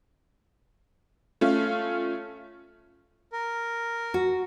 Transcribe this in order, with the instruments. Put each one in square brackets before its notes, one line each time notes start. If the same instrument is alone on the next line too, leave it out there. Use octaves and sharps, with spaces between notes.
[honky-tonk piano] A3 C#4 F4
[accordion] A#4
[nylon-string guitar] F#4